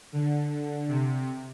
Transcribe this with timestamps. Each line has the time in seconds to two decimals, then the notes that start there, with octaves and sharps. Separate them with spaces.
0.13 D3
0.88 C3